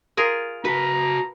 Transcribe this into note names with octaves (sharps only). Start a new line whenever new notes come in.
F4 G#4 A#4
F#4 B4 A5 A#5